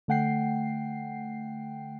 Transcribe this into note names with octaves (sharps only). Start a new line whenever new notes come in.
D3 A3 F#5 G5 C7